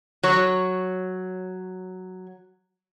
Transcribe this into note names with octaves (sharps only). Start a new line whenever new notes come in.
F#3 C#5